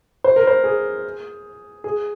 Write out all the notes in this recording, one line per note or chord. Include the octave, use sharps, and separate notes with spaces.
C5
A#4
C5
G#4
G#4